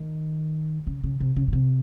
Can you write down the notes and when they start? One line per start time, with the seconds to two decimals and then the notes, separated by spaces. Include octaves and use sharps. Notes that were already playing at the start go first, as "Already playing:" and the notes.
Already playing: D#3
0.87 C#3
1.04 C#3
1.20 C3
1.36 C#3
1.48 A#2
1.53 C3